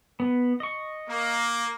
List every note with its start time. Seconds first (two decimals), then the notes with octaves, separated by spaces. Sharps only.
0.20 B3
0.60 D#5 C#6
1.08 A#3